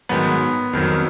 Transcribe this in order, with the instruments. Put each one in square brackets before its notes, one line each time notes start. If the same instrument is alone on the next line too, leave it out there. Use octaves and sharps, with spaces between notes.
[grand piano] G#2 D#3 F#3 B3
F2 D#3 F#3